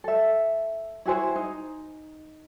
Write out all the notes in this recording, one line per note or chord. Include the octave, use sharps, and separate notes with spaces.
A4 E5
E4 F#4 G#4 C5
D#4